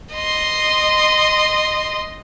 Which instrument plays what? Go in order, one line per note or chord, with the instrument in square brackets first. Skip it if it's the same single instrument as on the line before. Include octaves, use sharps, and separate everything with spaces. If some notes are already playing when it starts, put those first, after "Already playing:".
[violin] D#5 C6